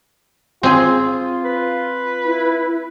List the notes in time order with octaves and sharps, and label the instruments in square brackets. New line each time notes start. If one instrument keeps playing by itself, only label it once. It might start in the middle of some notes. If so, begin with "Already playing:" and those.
[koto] C4 G#4 [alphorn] F4
[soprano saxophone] B4
[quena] E4